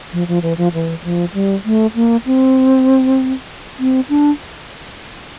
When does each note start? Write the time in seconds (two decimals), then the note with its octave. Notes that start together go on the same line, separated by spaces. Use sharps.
0.13 F3
0.28 F3
0.43 E3
0.58 F3
0.74 E3
1.04 F3
1.34 G3
1.65 A3
1.95 A#3
2.26 C4
3.79 C4
4.09 D4